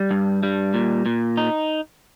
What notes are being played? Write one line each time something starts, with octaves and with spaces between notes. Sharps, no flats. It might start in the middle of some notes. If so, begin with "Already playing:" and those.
Already playing: G3
G2
G3
A#2
A#2
D#4